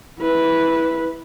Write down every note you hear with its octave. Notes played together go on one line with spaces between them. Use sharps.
E4 B4